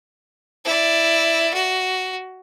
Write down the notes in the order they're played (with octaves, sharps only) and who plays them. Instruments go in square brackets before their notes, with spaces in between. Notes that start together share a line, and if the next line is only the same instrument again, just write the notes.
[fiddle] E4 D5
F#4